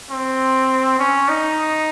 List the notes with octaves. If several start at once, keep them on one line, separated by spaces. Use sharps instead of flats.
C4
C#4
D#4